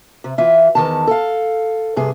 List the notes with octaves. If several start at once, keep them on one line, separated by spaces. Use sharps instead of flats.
C3
E3 F4 E5
E2 D#3 A5
A4 F5
G2 C3 G#4